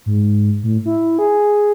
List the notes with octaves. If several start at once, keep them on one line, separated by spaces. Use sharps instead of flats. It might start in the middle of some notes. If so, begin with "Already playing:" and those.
G#2
A2
E4
G#4